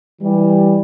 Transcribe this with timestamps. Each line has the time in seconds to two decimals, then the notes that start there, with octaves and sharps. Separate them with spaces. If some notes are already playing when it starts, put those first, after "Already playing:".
0.21 E3 G3